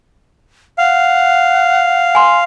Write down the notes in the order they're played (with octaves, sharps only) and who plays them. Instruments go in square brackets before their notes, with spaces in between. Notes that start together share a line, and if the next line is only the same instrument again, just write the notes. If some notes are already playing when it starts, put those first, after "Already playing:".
[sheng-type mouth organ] F5 [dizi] F#5
[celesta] G#5 C6